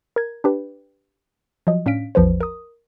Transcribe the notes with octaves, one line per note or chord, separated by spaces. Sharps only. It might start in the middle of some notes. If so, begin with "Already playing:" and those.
A#4 G#6
D4 G4 B4
F3 F#3 D#5
A2 C#4 D4 F5 B6 D7
A1 E2 F3 B4 C5
A#4 D#6